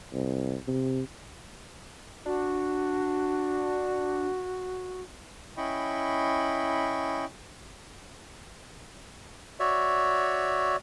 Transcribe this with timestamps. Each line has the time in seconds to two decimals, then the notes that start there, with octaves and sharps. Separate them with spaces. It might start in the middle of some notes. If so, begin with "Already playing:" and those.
0.13 C2
0.68 C3
2.26 D4 F#4
5.57 C#4 E4 D#5 G5 B5 C#6
9.60 F#4 C#5 D5 E5